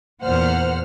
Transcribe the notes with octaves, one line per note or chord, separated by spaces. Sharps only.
E2 A#2 C5 F#5 F6